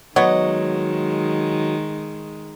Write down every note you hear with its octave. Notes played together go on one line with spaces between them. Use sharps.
D#3 F#3 G#3 B3 C#5 D#5